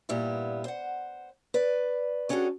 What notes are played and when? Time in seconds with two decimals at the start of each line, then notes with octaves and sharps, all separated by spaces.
0.09 G2 A#2 G3 B3 E4
0.64 C5 F#5
1.54 B4 D5
2.29 G3 C#4 D4 F#4 G#4 A4